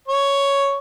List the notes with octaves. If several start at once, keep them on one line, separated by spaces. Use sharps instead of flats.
C#5